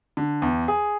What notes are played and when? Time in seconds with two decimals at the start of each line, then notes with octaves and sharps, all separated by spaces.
0.17 D3
0.42 E2
0.68 G#4